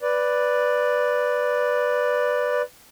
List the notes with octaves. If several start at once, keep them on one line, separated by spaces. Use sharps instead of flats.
B4 D5